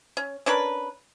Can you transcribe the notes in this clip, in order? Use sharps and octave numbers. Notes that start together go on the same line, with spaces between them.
C#4
C#4 D4 A#4 B4